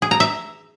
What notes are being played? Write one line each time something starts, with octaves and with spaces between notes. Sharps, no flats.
G#4
A#5
E5